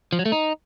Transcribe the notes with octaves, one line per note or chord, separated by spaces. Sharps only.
F3
F#3
A3
D#4